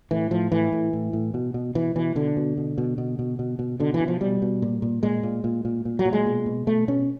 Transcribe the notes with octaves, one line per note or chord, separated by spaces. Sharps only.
A2 E3
A2 F3
A2 E3
A2
A2
A2
B2
B2
B2 E3
B2 E3
B2 D3
B2
B2
B2
B2
B2
B2
B2
B2 D3
E3
B2
F3
B2 G3
B2
A#2
A#2
A#2 G#3
A#2
A#2
A#2
A#2
F#3
A#2
G#3
B2
B2
B2 A3
B2 C#4